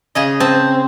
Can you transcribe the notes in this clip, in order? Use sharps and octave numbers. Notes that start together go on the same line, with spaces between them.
C#3 G#4 D#5
C4 A5